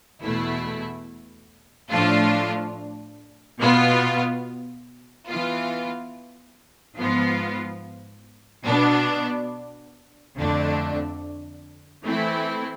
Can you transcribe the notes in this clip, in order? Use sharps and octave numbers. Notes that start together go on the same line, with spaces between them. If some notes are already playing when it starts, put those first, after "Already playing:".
E2 B2 A3 E4
A2 F3 A3 D4 F4
B2 B3 F4
E3 B3 F4
G#2 F3 B3 F4
B2 B3 D4
F2 D3 A3 D4
E3 A3 C4 E4